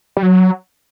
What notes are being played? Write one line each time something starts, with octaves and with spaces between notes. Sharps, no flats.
G3
F#3